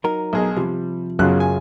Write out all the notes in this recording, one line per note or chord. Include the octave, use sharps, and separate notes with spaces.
F#3 D#4 A#4
B1 G#4 D#5
C3 F3 G3
B1 F#2 C#3 F4 F#6
G#5